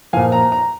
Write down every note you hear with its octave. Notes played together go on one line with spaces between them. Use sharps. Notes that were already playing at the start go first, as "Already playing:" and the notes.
A#2 F3 F5 G#5
A#5
A#5